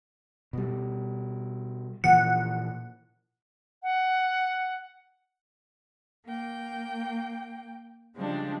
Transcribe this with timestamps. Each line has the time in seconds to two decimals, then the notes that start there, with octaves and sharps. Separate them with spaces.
0.53 B2 G3
2.04 A#2 E3 F3 F#5
3.83 F#5
6.26 A#3 G5
8.15 C#3 F3 G3 G#3 C4 D4